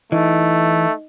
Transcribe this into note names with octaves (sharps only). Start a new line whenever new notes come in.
E3 A3 D#4 D#5